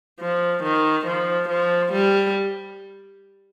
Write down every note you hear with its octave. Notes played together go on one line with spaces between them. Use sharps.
F3
D#3
F3
F3
G3